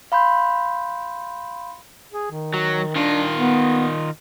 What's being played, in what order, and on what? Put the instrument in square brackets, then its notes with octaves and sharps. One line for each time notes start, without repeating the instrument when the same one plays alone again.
[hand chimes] F5 B5 C6 G6
[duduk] G#4
D#3
[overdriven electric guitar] F#3
[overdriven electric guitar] D#3 F4 [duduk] D4
[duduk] B3